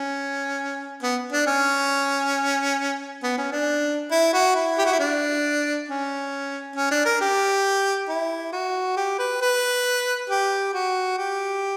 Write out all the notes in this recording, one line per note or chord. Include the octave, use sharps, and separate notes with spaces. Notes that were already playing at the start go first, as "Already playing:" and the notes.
Already playing: C#4
B3
D4
C#4
B3
C#4
D4
E4
F#4
E4
G4
F#4
E4
D4
C#4
C#4
D4
A#4
G4
E4
F#4
G4
B4
B4
G4
F#4
G4